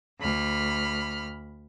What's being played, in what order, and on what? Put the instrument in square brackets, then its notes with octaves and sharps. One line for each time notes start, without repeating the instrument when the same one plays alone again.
[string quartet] D2 B5 F6